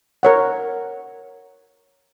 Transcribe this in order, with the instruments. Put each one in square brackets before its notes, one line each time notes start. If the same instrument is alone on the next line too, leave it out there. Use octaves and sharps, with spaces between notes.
[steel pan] A#4 C#5 F#5